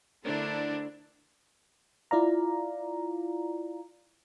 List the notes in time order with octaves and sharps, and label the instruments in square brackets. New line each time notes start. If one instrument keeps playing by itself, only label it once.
[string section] D3 A3 D4 E4 A#4 C5
[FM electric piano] E4 F4 D5 F5 A#5